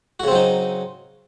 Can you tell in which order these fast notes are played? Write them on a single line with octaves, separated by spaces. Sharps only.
F#4 C#3 C4 F#3 D#4